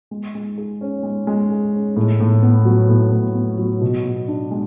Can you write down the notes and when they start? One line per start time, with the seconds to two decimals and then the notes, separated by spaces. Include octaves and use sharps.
0.11 G#3
0.35 G#3
0.58 G#4
0.81 C#4
1.03 G#3
1.27 G#3
1.50 G#4
1.73 C#4
1.96 A2
2.20 A2
2.42 B3
2.65 F#3
2.89 A2
3.12 A2
3.35 B3
3.58 F#3
3.81 B2
4.05 B2
4.28 D4
4.51 G#3